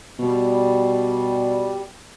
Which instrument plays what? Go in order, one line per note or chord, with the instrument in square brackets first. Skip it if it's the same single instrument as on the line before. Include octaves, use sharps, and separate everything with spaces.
[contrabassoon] B2 [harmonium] G3